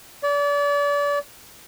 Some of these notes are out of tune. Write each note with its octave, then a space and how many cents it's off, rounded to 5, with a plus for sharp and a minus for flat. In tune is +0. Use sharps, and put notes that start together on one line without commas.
D5 -35